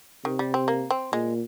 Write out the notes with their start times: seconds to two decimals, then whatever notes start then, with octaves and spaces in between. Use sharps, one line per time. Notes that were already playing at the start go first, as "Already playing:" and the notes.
0.24 C3 D#3
0.39 G3
0.54 C4
0.68 A#3
0.90 C4
1.12 A#2 G#3